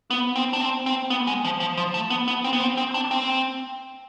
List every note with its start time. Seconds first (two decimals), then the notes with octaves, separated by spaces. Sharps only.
0.10 B3
0.36 C4
0.53 D4
0.61 C4
0.86 C4
1.10 B3
1.27 G#3
1.44 F3
1.60 F3
1.77 F3
1.94 A3
2.10 B3
2.28 B3
2.44 C4
2.53 B3
2.60 C4
2.77 C4
2.94 D4
3.11 C4